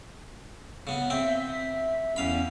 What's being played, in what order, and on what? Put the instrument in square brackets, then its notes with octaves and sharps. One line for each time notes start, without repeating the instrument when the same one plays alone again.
[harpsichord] C#3 B3
[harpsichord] C4 G5 [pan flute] E5
[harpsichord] E2 F5 B5 [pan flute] C#4